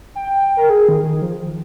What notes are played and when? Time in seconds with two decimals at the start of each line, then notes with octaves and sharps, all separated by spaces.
0.15 G5
0.57 A#4
0.69 G#4
0.89 D#3
1.03 D#3
1.22 F3